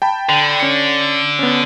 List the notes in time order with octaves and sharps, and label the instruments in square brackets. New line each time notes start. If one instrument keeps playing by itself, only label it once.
[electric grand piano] G5 A5 B5
[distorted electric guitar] D3
[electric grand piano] C#4 C#7
B3 C#4